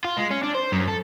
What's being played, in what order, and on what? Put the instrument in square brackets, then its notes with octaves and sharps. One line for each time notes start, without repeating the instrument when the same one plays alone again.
[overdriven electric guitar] F4
G#3
C#4
D4
C5
F#2
A4